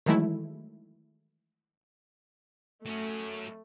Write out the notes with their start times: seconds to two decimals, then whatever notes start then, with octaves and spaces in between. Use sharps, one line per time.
0.06 D#3 E3 F#3 G#3 A3 E4
2.86 F#3 A3 C#4